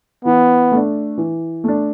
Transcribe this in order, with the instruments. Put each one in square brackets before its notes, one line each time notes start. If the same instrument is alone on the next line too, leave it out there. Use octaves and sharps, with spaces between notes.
[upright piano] E3 [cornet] B3
[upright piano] A3 D4
E3
A3 D4